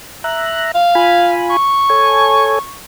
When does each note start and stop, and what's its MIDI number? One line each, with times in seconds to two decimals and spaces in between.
0.24 0.72 76
0.24 0.72 82
0.24 0.72 90
0.75 1.38 77
0.95 1.57 65
0.95 1.57 80
0.95 1.57 83
1.50 2.77 85
1.90 2.59 69
1.90 2.59 73
1.90 2.59 80